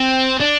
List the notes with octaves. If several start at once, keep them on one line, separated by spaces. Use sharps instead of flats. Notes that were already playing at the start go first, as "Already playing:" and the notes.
Already playing: C4
D4